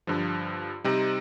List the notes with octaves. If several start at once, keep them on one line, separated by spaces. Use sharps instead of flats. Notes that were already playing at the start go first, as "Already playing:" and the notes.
G2 D3 F3
C3 G3 C4 D#4